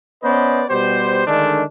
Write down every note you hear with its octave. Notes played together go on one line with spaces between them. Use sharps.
B3 C#4 B4 C5 D5 D#5
B2 G3 B3 G4 C5
D3 D#3 G#3 A3 D4